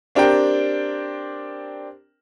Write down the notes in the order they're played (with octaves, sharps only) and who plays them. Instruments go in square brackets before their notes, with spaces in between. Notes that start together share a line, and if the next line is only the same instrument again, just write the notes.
[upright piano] C4 D4 G4 A#4 G5